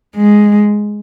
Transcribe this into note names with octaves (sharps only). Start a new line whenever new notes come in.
G#3